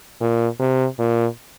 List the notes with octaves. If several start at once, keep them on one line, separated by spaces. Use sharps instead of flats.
A#2
C3
A#2